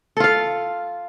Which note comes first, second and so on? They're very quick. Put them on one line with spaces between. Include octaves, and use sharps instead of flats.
A4 F4 F5